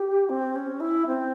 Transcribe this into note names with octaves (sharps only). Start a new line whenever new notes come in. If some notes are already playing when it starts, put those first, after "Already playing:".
Already playing: G4
C4
C#4
E4
C4